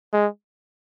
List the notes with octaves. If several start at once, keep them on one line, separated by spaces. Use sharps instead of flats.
G#3